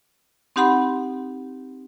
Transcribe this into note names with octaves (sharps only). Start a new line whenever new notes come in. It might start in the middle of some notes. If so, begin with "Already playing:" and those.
C4 D#4 G4 F#5 B5 C6